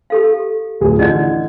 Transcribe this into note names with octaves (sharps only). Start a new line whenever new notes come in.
G4 A4 F5
D1 F3 G#4
D3 E3 D#5 G#6